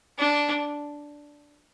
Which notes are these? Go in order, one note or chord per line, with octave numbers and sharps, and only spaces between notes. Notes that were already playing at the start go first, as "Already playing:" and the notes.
D4